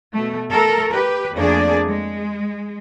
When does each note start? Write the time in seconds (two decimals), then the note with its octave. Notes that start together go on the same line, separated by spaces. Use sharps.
0.14 B2 A3
0.50 A3 A4 A#4
0.93 G4 B4
1.34 F2 A3 A#3 D4 G#4 D5
1.88 G#3